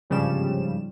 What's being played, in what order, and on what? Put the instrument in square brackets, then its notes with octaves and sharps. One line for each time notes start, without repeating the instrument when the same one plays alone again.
[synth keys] G1 G#2 C#3 F3 G3 E7